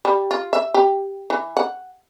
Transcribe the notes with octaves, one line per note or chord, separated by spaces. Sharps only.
G3
F4
E5
G4
E3
F#5